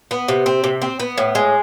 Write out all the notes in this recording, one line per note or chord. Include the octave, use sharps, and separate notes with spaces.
B3
C3
C4
C3
C4
B3
A2
G#3